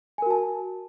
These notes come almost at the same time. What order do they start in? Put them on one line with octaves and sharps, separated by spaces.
G#5 A#4 F#4 A5